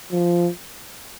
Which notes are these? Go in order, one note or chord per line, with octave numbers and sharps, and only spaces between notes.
F3